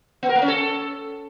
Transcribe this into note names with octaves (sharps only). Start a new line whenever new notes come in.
B3
A#4
A#3
C#4
A4